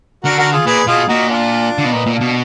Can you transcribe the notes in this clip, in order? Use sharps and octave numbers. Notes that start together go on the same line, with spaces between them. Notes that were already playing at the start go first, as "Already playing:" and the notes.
D3 F#4 A#4
F#4 A#4
F4 G#4
A#2 G#4 B4
B2 F4 G#4
A#2 D#4 F#4
D4 F4
D3
B2
A#2 B3 D#4
A#2
A#3 D4
B2